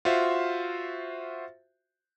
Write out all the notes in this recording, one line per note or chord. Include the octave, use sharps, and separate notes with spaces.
F4 F#4 C5 E5